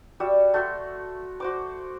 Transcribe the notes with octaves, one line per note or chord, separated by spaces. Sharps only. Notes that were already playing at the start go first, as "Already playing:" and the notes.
G3 F#4 E5
A3 F#4 C6
F#4 C5 D6